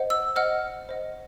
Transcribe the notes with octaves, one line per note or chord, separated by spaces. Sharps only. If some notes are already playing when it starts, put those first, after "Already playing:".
Already playing: C5 D#5 F#5
E6
C5 D#5 F#5 F6
C5 D#5 F#5